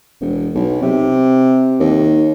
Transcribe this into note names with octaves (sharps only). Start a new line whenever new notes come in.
E1
B1
C3
D#2